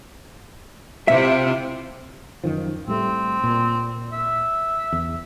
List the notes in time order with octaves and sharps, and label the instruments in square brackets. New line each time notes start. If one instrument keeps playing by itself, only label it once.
[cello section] C3 E4 F4 [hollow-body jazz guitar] E5
[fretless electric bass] F#2 D#3 F3
[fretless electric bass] A2 G3 A3 [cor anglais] C4
[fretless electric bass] A#2
[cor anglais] E5
[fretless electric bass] E2